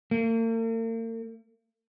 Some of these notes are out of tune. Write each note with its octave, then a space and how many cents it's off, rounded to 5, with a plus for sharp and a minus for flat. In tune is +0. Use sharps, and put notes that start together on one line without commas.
A#3 -45